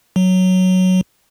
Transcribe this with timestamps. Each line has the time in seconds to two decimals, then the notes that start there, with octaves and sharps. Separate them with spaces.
0.16 F#3